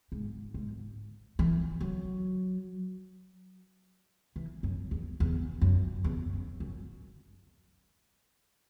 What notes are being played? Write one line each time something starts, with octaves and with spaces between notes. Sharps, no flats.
G#2
G#2
E3
F#3
E3
F#2
E2
E2
F#2
E2
F#2
F#2